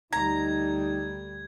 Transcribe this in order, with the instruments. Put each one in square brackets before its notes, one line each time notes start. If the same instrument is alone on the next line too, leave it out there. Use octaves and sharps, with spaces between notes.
[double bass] D2 G3 [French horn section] D#4 [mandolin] A#5 [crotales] G#6